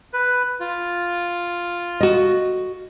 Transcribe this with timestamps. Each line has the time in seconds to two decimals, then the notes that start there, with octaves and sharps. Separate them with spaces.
0.13 B4
0.60 F4
2.00 F#4 D#5